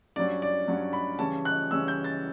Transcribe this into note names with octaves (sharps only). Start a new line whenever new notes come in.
G2 F#3 C#4 D5
D5
G2 F#3 C#4
B5
C#3 E3 G3 C#4 A5
F#6
C#3 E3 G3 C#4 E6
G6
A6